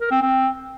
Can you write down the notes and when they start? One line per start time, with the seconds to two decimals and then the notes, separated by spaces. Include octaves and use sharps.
0.01 A#4
0.11 C4
0.21 C4